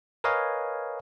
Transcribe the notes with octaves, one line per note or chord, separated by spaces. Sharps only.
A#4 B4 C#5 D#5 F5 G#5